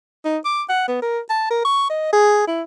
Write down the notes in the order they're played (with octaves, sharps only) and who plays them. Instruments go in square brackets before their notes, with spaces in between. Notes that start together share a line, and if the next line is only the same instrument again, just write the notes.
[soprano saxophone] D#4
D6
F#5
B3
A#4
A5
A#4
C#6
D#5
G#4
E4